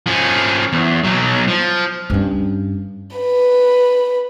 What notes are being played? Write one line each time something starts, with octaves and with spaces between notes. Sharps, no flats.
F3 C#4
E2
B1 F#3
F3
G2 C#4
B4